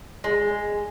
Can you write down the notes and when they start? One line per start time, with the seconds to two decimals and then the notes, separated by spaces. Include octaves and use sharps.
0.24 G#3